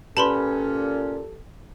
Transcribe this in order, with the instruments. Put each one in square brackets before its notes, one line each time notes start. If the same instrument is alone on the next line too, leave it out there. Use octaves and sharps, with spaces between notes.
[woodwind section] A#2 C#4 [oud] G4 B4 [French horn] A4 [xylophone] A5 B5 C6